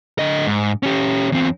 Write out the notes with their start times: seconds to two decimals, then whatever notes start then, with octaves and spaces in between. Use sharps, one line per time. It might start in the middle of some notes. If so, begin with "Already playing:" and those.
0.19 D3 D#5
0.47 G#2
0.83 C#4 G4
1.32 E2 C4